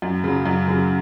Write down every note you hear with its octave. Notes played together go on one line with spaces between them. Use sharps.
F#2
C#3 F#3
F#2
C#3 F#3